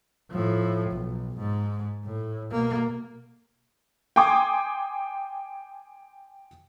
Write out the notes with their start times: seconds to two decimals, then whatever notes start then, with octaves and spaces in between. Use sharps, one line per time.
0.31 A2 F3
0.90 B1
1.38 G#2
2.05 A2
2.51 B2 A#3
4.16 G5 G#5 C6 D6 D#6 G#6